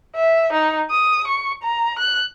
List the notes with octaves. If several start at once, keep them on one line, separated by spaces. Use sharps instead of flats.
E5
D#4
D#6
C#6
A#5
F#6